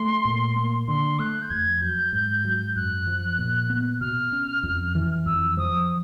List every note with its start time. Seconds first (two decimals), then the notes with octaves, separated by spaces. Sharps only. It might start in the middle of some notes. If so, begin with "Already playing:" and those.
Already playing: A3 C6
0.25 A#2
0.56 A#3
0.88 D3 C6
1.19 A3 F#6
1.42 G6
1.50 F2 G#6
1.82 F#3 G6
2.13 G#2
2.45 F#3
2.76 F#2 F#6
3.07 F3
3.38 A#2
3.70 B3
4.01 B2 F6
4.32 C#4
4.63 F2
4.95 E3
5.26 F2 E6
5.57 F3 D#6